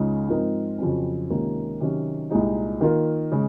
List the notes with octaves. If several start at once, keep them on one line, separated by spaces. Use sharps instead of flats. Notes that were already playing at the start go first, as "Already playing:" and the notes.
Already playing: C#2 C#3 G#3 D#4
G#2 F3 C4 D#4 A#4
F2 C#3 F#3 C4
C#2 C3 D#3 A#3 C#4
C3 D#3 F#3 C#4 F#4
C2 A#2 G#3 D#4
D#3 A#3 F4 A#4
C#3 G#3